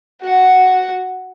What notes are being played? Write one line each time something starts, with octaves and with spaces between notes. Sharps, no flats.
F#4 F#5